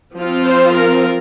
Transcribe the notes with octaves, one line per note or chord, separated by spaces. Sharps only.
F3 C4 F4
C5
A#4